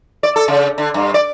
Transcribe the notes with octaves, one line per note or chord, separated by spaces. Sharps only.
D5
A4
C#3
D3
G2
D5